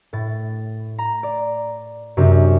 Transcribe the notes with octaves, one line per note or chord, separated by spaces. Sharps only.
A2 A6
A#5
D5
F#2 C3 C4 D4